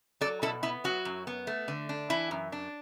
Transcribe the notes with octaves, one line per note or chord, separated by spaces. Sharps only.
F#3 A4 D5
B2 E4 A4
B3 E4
F#3 F#4
F#2
B3
A3
D3
D4
E3 E4
F#2
D4